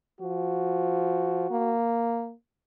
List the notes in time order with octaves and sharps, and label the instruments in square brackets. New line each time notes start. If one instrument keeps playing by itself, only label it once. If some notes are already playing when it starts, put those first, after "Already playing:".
[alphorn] F3 [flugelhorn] F#4
[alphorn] A#3